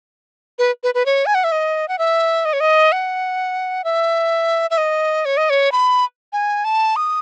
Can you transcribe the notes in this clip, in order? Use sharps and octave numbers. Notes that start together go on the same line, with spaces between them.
B4
B4
B4
C#5
G#5
F#5
E5
D#5
F#5
E5
D#5
C#5
D#5
F#5
E5
E5
D#5
C#5
D#5
C#5
B5
G#5
A5
D#6